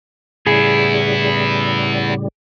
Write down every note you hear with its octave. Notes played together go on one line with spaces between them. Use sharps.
A2 C#3 G3 B3 E4 G#4